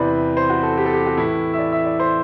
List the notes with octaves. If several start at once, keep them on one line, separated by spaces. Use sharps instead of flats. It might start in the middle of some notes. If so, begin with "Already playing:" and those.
Already playing: E2 C3 E3 C4 B4 D5
C5
F#4
A4
G4
A4
G4
F#4
A2 E3 E4
E5
D5
E5
D5
C5